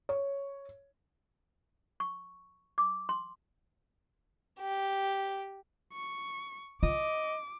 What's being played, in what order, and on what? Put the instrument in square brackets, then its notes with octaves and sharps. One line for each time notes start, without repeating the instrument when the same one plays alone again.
[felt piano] C#5
[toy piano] C#6
D6
C6
[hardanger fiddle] G4
[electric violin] C#6
[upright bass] F4 [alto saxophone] D#5 [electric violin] D6